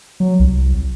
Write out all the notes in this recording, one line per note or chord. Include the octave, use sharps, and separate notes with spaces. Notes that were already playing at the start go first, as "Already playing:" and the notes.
F#3
C2